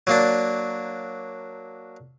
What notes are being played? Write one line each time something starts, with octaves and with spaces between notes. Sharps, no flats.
F#3 A#3 D4